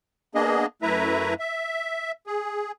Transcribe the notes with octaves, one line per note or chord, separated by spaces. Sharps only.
A#3 B3 D4 G#4 D#5
F#2 A3 E4 B4 E5 A#5
E5
G#4